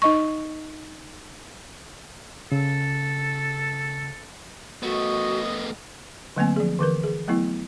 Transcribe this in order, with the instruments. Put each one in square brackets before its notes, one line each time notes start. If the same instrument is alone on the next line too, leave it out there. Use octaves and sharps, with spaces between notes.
[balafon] D#4 D#5 C#6
[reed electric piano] C#3 [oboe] A4
[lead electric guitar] A3 B3 [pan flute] F#4 [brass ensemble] D#5
[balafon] D3 F#3 A3 A#3 C4 G#5
F3 G#4
D3 E3 A#4 B4
G#4
F#3 A3 B3 E4